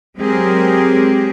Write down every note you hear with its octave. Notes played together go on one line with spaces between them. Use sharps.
F#3 G#3 C4 G4 G#4 A#4